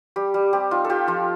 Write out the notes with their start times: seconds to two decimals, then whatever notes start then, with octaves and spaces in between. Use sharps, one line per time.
0.16 G3 G4
0.34 G3
0.53 C4 G4
0.71 D#4 F4
0.85 A4
0.90 F4 G4
1.07 F3 F4